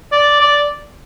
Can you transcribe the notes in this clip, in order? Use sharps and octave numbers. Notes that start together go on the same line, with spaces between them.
D5
D5